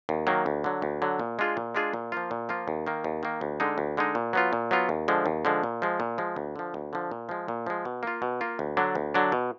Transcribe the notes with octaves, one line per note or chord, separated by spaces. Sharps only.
D#2
D#3 F#3 A#3
D2
D3 F#3
D2
D3 F#3
A#2
G#3 D4 F4 G#4
A#2
G#3 D4 F4 G#4
A#2
F3 A#3 F4
A#2
F3 A#3 F4
D#2
D#3 A#3
D#2
D#3 A#3
D2
D3 G#3 D#4
D2
D3 G#3 D#4
A#2
F#3 B3 F4
A#2
F#3 B3 F4
D#2
D3 F3 G#3
D#2
D3 F3 G#3
A#2
F3 G#3
A#2
F3 G#3
D2
D3 F3
D2
D3 F3
A#2
F3 G#3
A#2
F3 G#3
B2
A#3 F4
B2
A#3 F4
D2
D3 F#3 D4
D2
D3 F#3 D4
B2